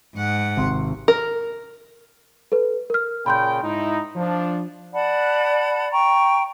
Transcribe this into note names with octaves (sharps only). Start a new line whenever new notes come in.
G#2 F#5
G#1 C3 C6
A#4
A4 B4
A#4 F6
A#2 C#3 G5 B5 C6 G6
G#2 D#4 E4
F3 D4
D5 F#5 A5 B5
G5 A#5 C#6